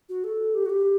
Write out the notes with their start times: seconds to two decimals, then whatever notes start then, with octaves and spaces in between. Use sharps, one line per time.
0.09 F#4
0.24 A4
0.55 G4
0.66 F#4
0.70 G4